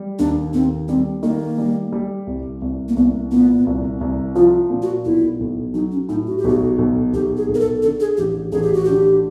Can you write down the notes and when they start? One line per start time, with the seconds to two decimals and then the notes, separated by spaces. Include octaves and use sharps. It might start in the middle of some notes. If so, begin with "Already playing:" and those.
Already playing: G3
0.19 D#2 D4
0.54 D#2 C4
0.88 G3 C4
1.23 D#3 A#3
1.58 G3
1.92 G3
2.27 C2
2.62 C2
2.88 A#3
2.97 C2 B3
3.31 A#2 B3
3.67 C2
4.01 C2
4.36 F3 F4
4.70 A#2
4.82 F#4
5.05 B1 E4
5.40 B1
5.74 F#3 D#4
5.91 C#4
6.09 A2 D#4
6.27 F#4
6.38 G4
6.44 B1 F#4
6.79 B1
7.14 B1 G4
7.37 G#4
7.49 B1
7.55 A#4
7.60 A4
7.82 D3 A4
8.00 G#4
8.17 A1 G4
8.52 A1 G#4
8.63 G4
8.74 F#4
8.85 D3 G4